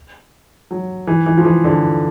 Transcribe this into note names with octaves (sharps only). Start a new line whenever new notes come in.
F#3
E3
E3
F3
E3
D3